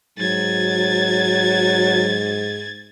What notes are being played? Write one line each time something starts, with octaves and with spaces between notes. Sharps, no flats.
G#2 F#3 G#6 A6